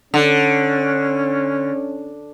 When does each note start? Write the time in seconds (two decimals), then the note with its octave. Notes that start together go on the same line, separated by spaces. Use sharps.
0.14 D3 C#4